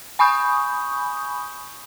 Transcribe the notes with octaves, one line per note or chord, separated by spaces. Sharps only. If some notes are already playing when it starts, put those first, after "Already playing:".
G#5 B5 C#6 D#6 G6